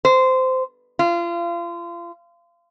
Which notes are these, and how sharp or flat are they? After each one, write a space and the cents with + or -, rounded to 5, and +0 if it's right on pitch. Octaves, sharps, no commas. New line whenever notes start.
C5 -15
F4 -30